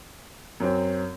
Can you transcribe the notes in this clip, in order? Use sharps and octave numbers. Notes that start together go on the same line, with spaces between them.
F#2 F#3 C4